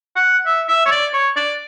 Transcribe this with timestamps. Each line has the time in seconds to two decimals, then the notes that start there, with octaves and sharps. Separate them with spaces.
0.16 F#5
0.46 E5
0.69 E5
0.86 C#5
0.91 D5
1.13 C#5
1.36 D5